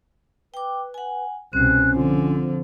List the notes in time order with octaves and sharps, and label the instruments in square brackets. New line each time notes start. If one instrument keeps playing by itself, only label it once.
[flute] B4 [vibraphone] G5 D6
[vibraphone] F#5 G#5
[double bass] C2 B2 [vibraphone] C4 C5 [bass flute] C#4 [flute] F#6
[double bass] D3 F3 [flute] F4